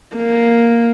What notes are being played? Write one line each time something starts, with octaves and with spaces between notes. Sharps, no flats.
A#3